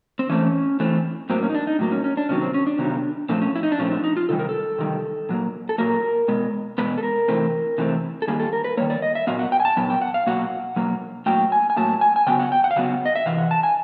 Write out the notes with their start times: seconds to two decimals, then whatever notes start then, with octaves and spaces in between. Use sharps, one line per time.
0.19 C4
0.29 E3 A3 C4 C#4
0.80 E3 A3 C4
1.30 A2 F#3 A#3 C4
1.42 C#4
1.49 D#4
1.55 D4
1.67 D#4
1.79 A2 F#3 A#3
1.92 C#4
2.04 C#4
2.17 D4
2.29 C3 D#3 F#3 B3 C#4
2.42 C4
2.54 C#4
2.67 D4
2.79 C3 D#3 F#3 B3
3.29 A#2 F3 A3 C4 D4
3.41 C#4
3.56 E4
3.63 D#4
3.72 D4
3.79 A#2 F3 A3 C4 C#4
3.91 D4
4.04 D#4
4.17 F4
4.29 C3 D#3 G3 A4
4.39 A#4
4.49 A4
4.78 C3 D#3 G3
5.29 A#2 F#3 A#3
5.69 A4
5.78 A#2 F#3 A#3 A#4
6.28 B2 G#3 B3
6.78 B2 G#3 B3 B4
6.98 A4
7.03 A#4
7.28 C3 E3 A3 C4
7.78 C3 E3 A3 C4
8.22 A4
8.27 D#3 G3 A#3 G#4
8.40 A4
8.53 A#4
8.64 B4
8.77 D#3 G3 A#3 C#5
8.90 D5
9.02 D#5
9.15 E5
9.27 A#2 F#3 B3 F5
9.39 F#5
9.52 G5
9.60 G#5
9.65 A5
9.77 A#2 F#3 B3
9.90 G5
10.02 F#5
10.14 F5
10.27 B2 F#3 A#3 F#5
10.76 B2 F#3 A#3
11.26 A2 F#3 A#3 G5
11.52 G#5
11.70 G#5
11.76 A2 F#3 A#3 A5
12.01 G#5
12.16 G#5
12.27 C#3 F#3 B3 G5
12.39 F#5
12.52 G5
12.64 F#5
12.71 F5
12.76 C#3 F#3 B3 F#5
13.06 D#5
13.16 E5
13.26 C3 E3 F5
13.38 F#5
13.51 A5
13.63 G#5